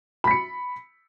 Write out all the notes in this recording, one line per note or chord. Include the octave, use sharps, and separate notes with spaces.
B5 B6 C#7